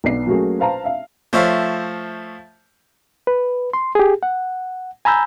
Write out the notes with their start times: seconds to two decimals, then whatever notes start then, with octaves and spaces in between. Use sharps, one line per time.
0.04 B1 B3 D5 C7
0.27 F#3 A3 A#3 C#4 F#4 G#4
0.59 B4 C5 F5 A5 A#5
0.84 E5 F5
1.33 F3 A3 C5 C#5 E5 F5
3.27 B4
3.73 C6
3.95 G4 G#4
4.23 F#5
5.05 G#5 A#5 B5 E6 G6